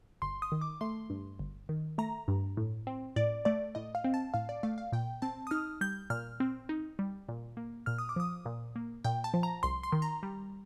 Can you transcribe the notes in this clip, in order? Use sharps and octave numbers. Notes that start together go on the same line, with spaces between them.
G1 C6
D#6
D#3
D6
A3 C6
G2
G1
D#3
A3 A#5
G2
A2
C4
A2 D5
A3 D5
A2 D#5
F5
C4
A5
A2 F5
D5
A3 F5
F5
A#2 G5
C4 A5
D#6
D#4 F6
G3 G6
A#2 F6
C4
D#4
G3
A#2
A#3
A#2 F6
D#6
D6
F3 D#6
A#2
A#3
A#2 G5
A5
F3
A#5
C2 C6
C6
D#3
A#5
G3